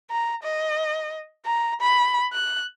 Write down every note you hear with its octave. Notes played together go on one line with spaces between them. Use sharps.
A#5
D#5
A#5
B5
F#6